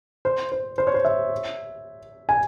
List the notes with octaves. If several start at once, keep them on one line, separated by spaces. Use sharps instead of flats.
C5
C5
C5
C#5
C5
E5
G#5